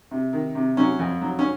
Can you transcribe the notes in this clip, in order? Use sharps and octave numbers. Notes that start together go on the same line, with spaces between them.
C3
D#3
C3
F#3 C#4
F2
F#3
C#4